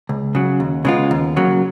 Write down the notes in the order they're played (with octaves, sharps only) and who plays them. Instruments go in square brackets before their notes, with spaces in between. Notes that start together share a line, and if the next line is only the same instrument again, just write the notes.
[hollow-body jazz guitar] C#2
C#3 F#3
D#2
C#3 G#3 B3 F4
D#2
C#3 F#3 A#3